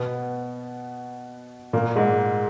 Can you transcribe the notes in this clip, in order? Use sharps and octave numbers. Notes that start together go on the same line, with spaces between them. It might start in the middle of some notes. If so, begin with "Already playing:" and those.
Already playing: B2 B3
A#2 A#3
G#2 G#3